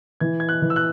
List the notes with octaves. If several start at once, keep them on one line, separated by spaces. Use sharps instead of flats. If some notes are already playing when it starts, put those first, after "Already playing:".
E3 G#6
G#6
F#6
E3
E6
F#6